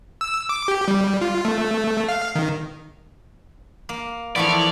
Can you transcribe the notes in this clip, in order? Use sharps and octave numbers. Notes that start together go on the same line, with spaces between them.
E6
D6
G4
G3
F4
A3
F5
D#3
A#3
E3 F3 A3 B3 E4 D5 C#6 F6